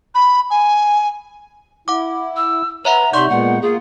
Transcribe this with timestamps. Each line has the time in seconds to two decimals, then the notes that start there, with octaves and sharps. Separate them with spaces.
0.15 B5
0.50 G#5
1.88 E4 F#5 D6
2.37 E6
2.85 B4 C#5 E5 F#5 A#5
3.13 C3 D#4 D5 E5 C6 C#6 G6
3.30 A#2 G#3 B3 F#5
3.62 A#3 F4 G#4